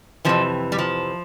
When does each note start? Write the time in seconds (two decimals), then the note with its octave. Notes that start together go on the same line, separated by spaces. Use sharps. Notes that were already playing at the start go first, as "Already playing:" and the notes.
0.25 F2 C3 E3 F3
0.72 G3
0.78 F3